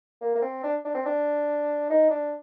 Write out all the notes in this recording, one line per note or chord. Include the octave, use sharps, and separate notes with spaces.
A#3
A#3
C4
D4
D4
C4
D4
D#4
D4